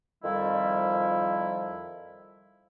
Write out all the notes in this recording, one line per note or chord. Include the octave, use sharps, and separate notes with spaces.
F2 D#3 F3 G3 E4